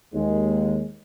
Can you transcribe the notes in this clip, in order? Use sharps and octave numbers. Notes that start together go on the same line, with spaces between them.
D#2 G#3